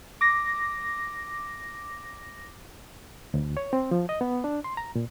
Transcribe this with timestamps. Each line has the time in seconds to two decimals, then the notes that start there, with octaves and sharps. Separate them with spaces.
0.21 D6 A#6
3.34 D2
3.57 C#5
3.73 C4
3.91 F3
4.09 D#5
4.21 B3
4.44 D4
4.64 C6
4.77 A#5
4.95 A#2